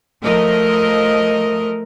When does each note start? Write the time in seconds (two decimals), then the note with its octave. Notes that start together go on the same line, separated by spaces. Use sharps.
0.22 F3 A3 A#4 D#5